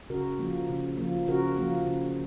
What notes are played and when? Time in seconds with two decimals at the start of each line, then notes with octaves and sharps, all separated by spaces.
0.10 C#3 F#4 A#4
0.39 F3 A#3
0.69 C#3
0.98 F3 A#3
1.28 C#3 F#4 A#4
1.58 F3 A#3
1.87 C#3